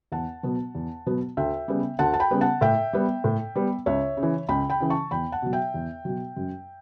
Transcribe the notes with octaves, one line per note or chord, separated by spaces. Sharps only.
E2 F#5 A5
B2 F#3 B3
E2
B2 F#3 B3
D2 E5 G5
C#3 G3 B3
D2 F#5 A5
A5
G5 B5
C#3 G3 B3
F#5 A5
A2 E5 G5
G3 B3
A2
G3 B3
C#2 C#5 E5
C#3
E3
C#2 G5 B5
G5 B5
C#3 E3
A5 C#6
E2 G5 B5
F#5 A5
B2 F#3
E5 G5
E2
B2 F#3
F#2